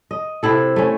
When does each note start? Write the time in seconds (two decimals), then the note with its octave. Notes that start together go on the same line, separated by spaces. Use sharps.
0.11 D#5
0.43 C3 C4 E4 A4
0.76 A3 C#4